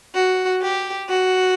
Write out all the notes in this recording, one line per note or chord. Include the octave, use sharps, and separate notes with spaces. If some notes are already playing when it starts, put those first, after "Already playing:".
F#4
G4
F#4